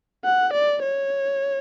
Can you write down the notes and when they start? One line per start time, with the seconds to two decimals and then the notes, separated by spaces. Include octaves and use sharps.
0.25 F#5
0.53 D5
0.82 C#5